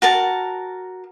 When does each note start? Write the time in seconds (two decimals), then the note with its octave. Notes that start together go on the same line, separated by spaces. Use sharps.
0.02 F#4 A#4 A5